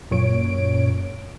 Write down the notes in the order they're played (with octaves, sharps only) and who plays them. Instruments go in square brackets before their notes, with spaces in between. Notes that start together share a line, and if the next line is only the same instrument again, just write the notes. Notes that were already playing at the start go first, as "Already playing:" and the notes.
[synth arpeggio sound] F#2 A#2 C#5 D7